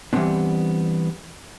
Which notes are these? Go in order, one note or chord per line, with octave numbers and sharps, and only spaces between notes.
E3 G3 G#3 B3 C4 D4